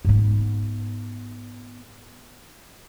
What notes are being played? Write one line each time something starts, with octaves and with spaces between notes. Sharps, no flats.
G#2 B3